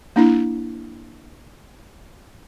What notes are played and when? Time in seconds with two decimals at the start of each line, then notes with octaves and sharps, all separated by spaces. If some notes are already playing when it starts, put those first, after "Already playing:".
0.16 A#3 D4 E4